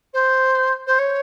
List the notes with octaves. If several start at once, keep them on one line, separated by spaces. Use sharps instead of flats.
C5
C5
C#5